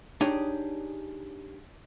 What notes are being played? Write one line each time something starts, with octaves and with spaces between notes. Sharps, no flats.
D4 D#4 G4 G#4 C#5 D5